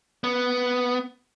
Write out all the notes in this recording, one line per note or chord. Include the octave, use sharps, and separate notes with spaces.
B3